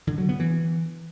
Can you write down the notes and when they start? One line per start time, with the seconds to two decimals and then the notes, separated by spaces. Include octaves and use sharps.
0.07 D3
0.18 F#3
0.29 B3
0.40 E3